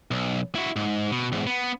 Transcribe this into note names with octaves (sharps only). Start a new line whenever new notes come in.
B1
E4 F#4
G#2
B2
E2 G#2
B3